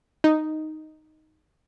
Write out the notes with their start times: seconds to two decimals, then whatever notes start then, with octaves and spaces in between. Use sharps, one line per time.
0.24 D#4